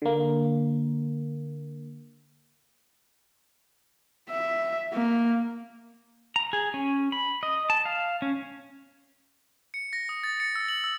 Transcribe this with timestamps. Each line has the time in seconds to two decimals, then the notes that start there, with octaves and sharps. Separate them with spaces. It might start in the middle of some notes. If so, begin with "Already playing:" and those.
0.02 D3 A#3
4.30 E5
4.93 A#3
6.36 A#5
6.53 G#4
6.74 C#4
7.12 B5
7.43 D#5
7.70 A5
7.85 F5
8.22 C#4
9.74 C#7
9.93 A#6
10.09 D#6
10.24 A6
10.40 C#7
10.55 E6
10.68 F#7
10.84 E6